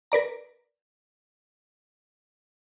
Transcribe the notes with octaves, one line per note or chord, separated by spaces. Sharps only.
A#4 B4 D5 A#5